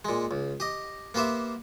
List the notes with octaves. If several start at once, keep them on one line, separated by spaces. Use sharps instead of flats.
A#2 G#3
C#2
G4 D#5
A#3 B3 G4 C5 E5